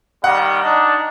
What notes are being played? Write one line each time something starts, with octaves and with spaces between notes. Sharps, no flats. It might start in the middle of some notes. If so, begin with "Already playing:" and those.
D#3 G3 F#5
D4 D#4